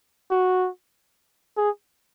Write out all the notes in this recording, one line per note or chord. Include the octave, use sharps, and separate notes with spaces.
F#4
G#4